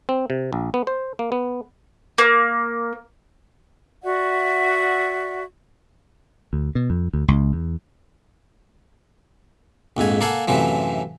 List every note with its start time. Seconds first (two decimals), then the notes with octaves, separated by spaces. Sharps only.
0.09 C4
0.30 C3
0.53 A#1
0.74 B3
0.87 C5
1.19 A#3
1.32 B3
2.18 A#3
4.03 F#4 D5 E5 F#5
6.53 D2
6.75 B2
6.90 F2
7.13 D2
7.28 C#2
7.53 E2
9.97 A#1 F2 G#2 G#5
10.21 A#3 A4 F5 F#5 G#5
10.48 F#2 A2 C3 E3 F3